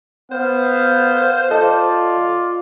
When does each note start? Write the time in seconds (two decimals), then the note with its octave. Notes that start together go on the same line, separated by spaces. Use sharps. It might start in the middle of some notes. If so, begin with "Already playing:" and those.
0.32 B3 C5 F5
1.51 F4 A4 D5 D#5 A5